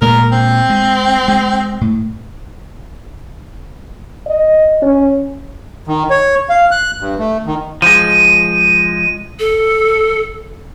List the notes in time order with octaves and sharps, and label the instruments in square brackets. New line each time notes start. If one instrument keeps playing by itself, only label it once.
[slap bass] A#2 G#3 [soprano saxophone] A#4
[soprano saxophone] C4
[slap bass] G#3
G#3
A2
[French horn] D#5
C#4
[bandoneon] D#3
C#5
F5
F#6
G2
A3
D#3
[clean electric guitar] F3 G#3 [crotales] D#7
[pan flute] A4